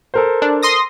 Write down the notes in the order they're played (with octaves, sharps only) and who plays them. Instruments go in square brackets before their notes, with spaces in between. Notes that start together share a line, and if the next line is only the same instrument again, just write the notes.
[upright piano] A4 A#4 C5
[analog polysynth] D4
C6 D#6 A#6